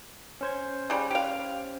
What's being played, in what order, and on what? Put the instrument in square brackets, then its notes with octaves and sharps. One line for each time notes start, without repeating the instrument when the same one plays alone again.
[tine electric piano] C#4 C5 G#6
[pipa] C#3 G3
G4 F5